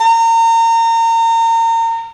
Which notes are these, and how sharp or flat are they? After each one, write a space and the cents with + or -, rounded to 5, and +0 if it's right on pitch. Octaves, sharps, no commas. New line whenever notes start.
A#5 -30